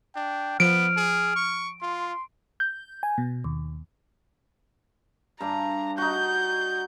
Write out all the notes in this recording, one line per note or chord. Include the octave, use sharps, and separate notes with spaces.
D4 G5
F3 B3 F6 D7
G#4
C#6
F4 C6
G6
G#5
B2
D#2
G2 D4 A#5
D#4 F#4 G6